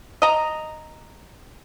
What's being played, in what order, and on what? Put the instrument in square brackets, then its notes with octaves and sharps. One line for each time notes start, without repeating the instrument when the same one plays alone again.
[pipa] D#5 A#5